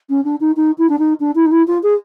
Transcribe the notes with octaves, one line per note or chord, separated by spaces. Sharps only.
C#4
D4
D#4
D#4
E4
D4
D#4
D4
E4
D#4
E4
F4
G#4